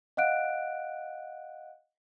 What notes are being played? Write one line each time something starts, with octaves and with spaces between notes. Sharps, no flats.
D#5 F5 F#5 F#6 D7